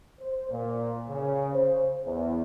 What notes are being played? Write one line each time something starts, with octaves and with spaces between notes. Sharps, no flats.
C5
A#2
C#3
C5
E2